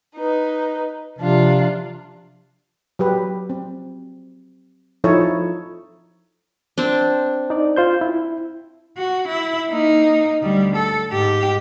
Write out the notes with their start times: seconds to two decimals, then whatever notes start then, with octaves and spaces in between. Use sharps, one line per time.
0.15 D#4 B4
1.19 C3 F3 D4 F4
2.99 F#3 G4 B4
3.50 C4
5.04 F3 D#4 E4 A4 C#5
6.78 C4 D4
7.50 D#4 D5
7.76 F4 C5 G6
8.01 E4
8.97 F#4
9.28 E4
9.69 A#3 D#4
10.42 D2 G3
10.76 A4
11.10 G#2 G4